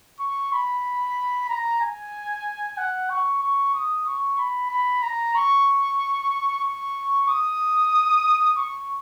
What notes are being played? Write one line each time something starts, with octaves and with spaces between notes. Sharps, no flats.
C#6
B5
A#5
G#5
F#5
C#6
C#6
D#6
C#6
B5
B5
A#5
C#6
C#6
D#6
C#6